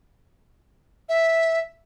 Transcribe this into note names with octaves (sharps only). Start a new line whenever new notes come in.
E5